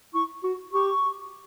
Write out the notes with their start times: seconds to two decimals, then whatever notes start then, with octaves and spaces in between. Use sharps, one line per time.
0.14 E4 C#6
0.43 F#4
0.73 G4 C#6